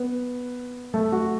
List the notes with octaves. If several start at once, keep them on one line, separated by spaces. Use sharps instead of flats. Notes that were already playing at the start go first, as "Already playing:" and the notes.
Already playing: B3
A3
F#4